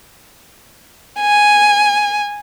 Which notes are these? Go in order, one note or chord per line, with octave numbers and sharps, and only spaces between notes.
G#5